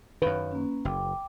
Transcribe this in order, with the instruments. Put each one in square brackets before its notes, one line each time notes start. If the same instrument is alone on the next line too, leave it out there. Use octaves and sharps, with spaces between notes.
[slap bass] F#2 D#3 [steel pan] B4 [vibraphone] C#5 F5
[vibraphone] A#3 C#4
[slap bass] F#1 [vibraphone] G5 D6